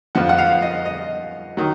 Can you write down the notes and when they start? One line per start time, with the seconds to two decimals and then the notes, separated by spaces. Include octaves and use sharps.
0.15 F2 F3 F#5
0.29 F#5
0.38 F5
0.62 D#5
0.86 D#5
1.57 D#3 F#3